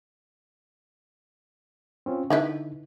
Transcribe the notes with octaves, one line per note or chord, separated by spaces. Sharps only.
C4 C#4 F4
D3 D#4 E4 B4